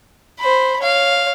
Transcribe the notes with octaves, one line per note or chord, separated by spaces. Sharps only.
C5 B5
C#5 F5